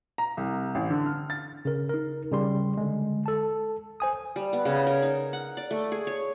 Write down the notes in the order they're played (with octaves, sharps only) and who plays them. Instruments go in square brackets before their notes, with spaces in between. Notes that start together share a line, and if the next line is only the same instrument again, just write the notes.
[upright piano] A#5
C2
A1
D3
F6
A6
[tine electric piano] C#3 A#4
D#4 A#4
C#3 G3 C6
D3 G#3
A4 A5
C5 G#5 D#6
[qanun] G3
B3
C#3
A#4
D#4
F#5
D5
A3
G#4
C#5